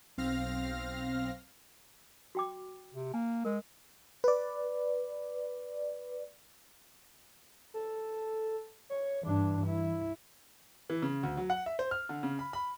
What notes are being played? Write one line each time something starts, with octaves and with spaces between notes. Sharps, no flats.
B1 C4 F5 F6 A#6
F#4 G5 D6
C3
A#3 G#5
G#3 A#4
B4 D5
A4
C#5
G2 E3 D4
E4
E3
C#3
D2
F#3
F#5
E5
C5
F6
D3
C#3
B5
B5